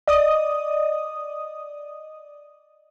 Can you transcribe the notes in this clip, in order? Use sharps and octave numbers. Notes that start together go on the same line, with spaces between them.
D5 D#5 D#6